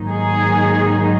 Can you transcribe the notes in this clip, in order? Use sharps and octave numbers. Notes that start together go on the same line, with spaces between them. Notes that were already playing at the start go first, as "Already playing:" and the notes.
Already playing: G#2 D#3 F#3 A#3 D#4
G#4